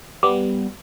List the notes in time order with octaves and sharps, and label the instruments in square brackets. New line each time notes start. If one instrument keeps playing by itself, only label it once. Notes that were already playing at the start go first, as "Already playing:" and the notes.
[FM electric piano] G3 B3 [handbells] D6